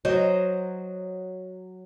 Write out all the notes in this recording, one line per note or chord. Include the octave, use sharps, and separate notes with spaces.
F#3 C5 D#5